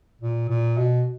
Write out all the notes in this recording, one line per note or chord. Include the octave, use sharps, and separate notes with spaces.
A#2
A#2
B2